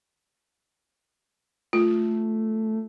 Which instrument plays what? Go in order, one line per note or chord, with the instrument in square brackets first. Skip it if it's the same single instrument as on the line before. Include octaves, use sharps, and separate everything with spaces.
[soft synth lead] A3 [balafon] F4